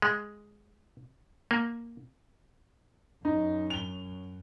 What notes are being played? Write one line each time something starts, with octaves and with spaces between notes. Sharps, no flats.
G#3
A#3
F#2 D#4
F7 G7